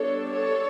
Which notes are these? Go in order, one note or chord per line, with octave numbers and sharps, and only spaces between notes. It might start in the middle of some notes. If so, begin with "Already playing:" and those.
Already playing: G3 B3 D4 A4 C#5
A4 C#5